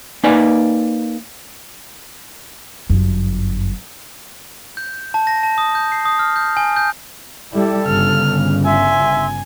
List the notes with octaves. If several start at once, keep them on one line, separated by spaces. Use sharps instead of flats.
A#3 D#4 B4 D5 G#5
G1 F#2
G6
A5
A#6
A5
D#6
G6
C7
D#6
F6
G6
G#5
G6
G3 E4 A4
G1 C#3 F6
E5 G#5 C6 E6